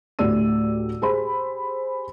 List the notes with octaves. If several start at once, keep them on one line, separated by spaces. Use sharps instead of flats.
D2 A2 G4 D5 E6 D#7
G4 G#4 C5 B5